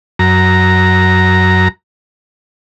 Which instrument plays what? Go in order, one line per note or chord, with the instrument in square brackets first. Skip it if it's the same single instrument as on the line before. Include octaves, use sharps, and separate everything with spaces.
[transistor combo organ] F#2 A#5